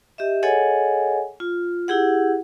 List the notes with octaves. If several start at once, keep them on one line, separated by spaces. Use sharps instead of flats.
G4 D#5 E5
G#4 A4 C#5 D#5 F#5 G#5
F4
E4 G4 G#4 F#5